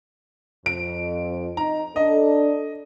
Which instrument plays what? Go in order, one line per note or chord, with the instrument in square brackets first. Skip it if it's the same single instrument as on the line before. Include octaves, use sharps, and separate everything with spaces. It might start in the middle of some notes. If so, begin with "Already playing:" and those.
[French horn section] F2 [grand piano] D7
[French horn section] D#4 [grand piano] A#5
[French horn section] D4 A4 [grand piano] D#5